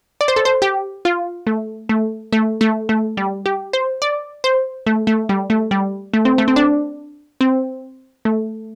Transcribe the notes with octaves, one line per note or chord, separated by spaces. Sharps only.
D5
C5
A4
C5
G4
F4
A3
A3
A3
A3
A3
G3
G4
C5
D5
C5
A3
A3
G3
A3
G3
A3
C4
A3
C4
D4
C4
A3